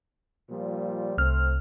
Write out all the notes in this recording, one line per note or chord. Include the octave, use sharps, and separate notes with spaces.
A#2 F3 G3
C2 A3 C4 F6